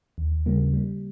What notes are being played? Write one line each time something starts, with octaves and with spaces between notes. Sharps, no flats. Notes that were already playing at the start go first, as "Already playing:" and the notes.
D#2
C#3 G3 A#3
G3